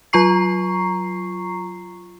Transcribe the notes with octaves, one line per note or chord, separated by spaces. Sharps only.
F#3 F4 A#5 C#6 C7